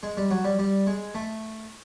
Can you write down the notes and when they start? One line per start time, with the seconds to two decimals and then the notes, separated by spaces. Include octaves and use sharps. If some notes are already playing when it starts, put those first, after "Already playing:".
0.03 G#3
0.17 G3
0.30 F#3
0.44 G3
0.59 G3
0.87 G#3
1.15 A3